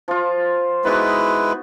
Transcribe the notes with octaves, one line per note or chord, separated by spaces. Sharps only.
F3 F4
G#3 B3 D#4 E4 F#4 B4